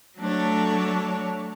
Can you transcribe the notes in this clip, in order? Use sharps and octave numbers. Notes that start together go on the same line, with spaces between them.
F#3 A3 D4 A4 C#5